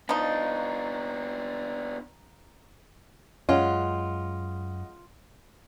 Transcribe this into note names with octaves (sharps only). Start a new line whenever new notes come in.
F3 B3 D4 D#4
F#2 G#3 C#4 F4 D#5 F#5